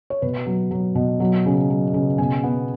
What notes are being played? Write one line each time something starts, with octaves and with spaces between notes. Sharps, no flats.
C#5
B2 B4
F#3
F#3
B2
F#3
C#3
F#3
C#3
B2 G#5
B3